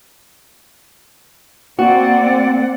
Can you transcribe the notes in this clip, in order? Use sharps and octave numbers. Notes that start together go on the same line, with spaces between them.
A#3 C4 F#4 D5 F#5